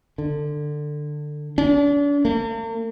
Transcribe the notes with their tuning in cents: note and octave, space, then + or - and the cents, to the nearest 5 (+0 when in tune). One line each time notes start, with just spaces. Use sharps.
D3 +20
D4 -40
A#3 -45